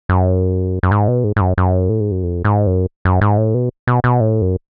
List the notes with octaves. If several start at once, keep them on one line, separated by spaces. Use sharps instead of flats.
F#2
F#2
G#2
B2
G#2
G#2
F#2
F#2
A2
G#2
F#2
F2
G#2
F#2
F#2
G#2
A2
B2
B2
B2
A2
F#2